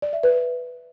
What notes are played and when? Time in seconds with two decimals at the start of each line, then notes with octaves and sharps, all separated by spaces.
0.02 D5
0.13 E5
0.23 B4